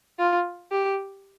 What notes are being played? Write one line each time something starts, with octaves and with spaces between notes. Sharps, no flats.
F4
G4